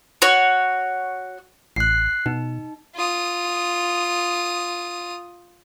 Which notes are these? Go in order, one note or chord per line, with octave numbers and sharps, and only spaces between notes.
F#4 C#5
A1 F#6 C7
B2 D#4
F4 D#6